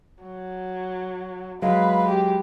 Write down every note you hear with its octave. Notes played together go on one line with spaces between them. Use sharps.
F#3
F#3 G#3 B4 F5
G4